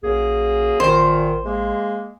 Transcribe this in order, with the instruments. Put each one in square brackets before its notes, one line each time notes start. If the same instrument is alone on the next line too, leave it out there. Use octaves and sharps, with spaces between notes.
[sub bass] A#1 [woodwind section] F#2 A#3 G#4
[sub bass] A1 [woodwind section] A#2 D#3 [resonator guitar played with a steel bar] C5
[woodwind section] G#3 A#3